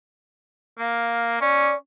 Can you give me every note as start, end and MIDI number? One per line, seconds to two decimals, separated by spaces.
0.79 1.37 58
0.79 1.40 77
1.41 1.72 61
1.41 1.74 74